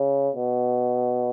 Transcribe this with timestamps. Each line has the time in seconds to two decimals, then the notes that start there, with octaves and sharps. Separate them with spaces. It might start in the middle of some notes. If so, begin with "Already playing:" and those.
Already playing: C#3
0.35 B2